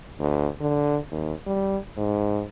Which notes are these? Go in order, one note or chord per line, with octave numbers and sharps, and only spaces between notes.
D2
D3
D#2
G3
G#2